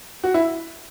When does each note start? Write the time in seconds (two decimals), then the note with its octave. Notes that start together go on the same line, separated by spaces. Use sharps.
0.24 F#4
0.34 E4